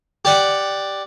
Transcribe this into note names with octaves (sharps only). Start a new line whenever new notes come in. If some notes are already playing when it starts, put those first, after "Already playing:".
G4 D5 F#5